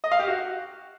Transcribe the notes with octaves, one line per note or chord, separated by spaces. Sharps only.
D#5
F5
G4
F#4